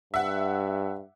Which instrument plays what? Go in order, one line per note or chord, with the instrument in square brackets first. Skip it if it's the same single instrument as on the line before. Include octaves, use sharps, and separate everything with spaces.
[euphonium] G2 [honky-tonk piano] E5 F#5